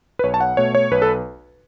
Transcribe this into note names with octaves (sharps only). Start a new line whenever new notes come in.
B4
B1 C#5
A5
F#5
B2 A3 C#5
C#5
B1 B4
A4